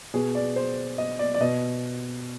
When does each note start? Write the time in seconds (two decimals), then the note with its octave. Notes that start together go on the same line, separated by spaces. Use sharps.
0.14 B2 G#4
0.35 D5
0.56 C5
0.98 D#5
1.19 D5
1.34 D5
1.40 B2 D#5